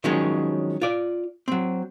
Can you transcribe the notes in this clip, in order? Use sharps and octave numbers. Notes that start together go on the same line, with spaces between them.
D#3 F3 F#3 G#3 C#4 D4
F4 D5
F#3 C4